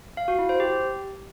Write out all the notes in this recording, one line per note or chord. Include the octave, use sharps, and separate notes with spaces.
F5
F#4
E4
C5
G4